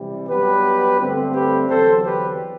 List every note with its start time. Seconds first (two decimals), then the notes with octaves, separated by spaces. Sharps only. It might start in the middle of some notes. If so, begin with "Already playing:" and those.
Already playing: C3 E3 G3
0.28 G2 F#3 B3 G4 B4
0.98 G2 D3 A3 C4
1.34 G4 B4
1.69 E2 D3 F#3 A4 C5
2.04 G4 B4